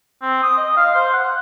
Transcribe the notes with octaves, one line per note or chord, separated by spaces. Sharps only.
C4
D#6
D#5
F5
C5
F#5